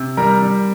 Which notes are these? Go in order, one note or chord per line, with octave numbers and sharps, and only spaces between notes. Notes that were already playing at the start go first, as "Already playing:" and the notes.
Already playing: C3
G3 A#4 A#5
G3